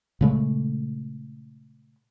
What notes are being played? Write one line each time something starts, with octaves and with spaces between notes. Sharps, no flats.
A#2 C#3 G#3 A3